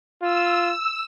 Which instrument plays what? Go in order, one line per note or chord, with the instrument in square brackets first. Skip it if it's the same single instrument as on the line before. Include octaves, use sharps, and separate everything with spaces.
[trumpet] F4 [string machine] E6